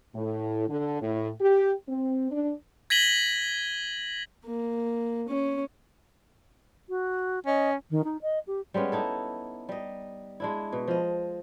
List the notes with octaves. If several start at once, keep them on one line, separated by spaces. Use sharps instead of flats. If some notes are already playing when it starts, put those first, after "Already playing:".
A2
D3
A2
G4
C4
D4
G#6 A#6 B6 D#7 F#7 G7
A#3
C#4
F#4
C#4 D#5
D#3
D#4
D#5
G4
G3 G#3 B3 C#4
D#4 E4 A4
G3 D#5
G#3 D4 E4
B2
F3 D#5